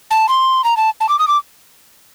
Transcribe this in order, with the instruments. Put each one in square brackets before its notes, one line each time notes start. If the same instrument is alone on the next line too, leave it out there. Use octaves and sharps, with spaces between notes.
[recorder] A5
C6
A#5
A5
A5
D6
D#6
D6